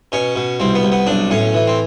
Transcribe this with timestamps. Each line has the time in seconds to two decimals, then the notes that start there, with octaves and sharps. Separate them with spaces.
0.12 B2 C#4
0.36 B2
0.60 C2 C4
0.75 B3
0.83 C2
0.92 B3
1.07 B1 D4
1.30 A2 C#4
1.54 E3
1.67 C4